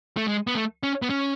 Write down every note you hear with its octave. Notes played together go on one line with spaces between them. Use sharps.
A3
G#3
B3
A3
C#4
B3
C#4